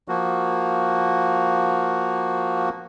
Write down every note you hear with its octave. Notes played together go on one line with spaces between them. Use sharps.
F3 A#3 F#4